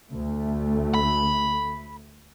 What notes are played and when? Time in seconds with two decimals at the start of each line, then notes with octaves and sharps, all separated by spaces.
0.12 D2 A3
0.94 B5